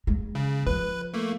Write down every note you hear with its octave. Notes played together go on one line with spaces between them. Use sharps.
G#3
C#3
F3 B4
A3 A#3